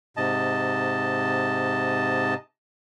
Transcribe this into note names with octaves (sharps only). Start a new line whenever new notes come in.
G#2 C3 D#5 A5